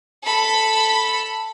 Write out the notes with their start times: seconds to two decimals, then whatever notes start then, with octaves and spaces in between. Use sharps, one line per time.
0.23 A4 B5